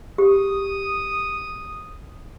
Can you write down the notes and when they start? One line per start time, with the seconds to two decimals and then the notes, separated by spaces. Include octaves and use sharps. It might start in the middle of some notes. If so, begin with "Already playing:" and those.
0.18 G4 D#6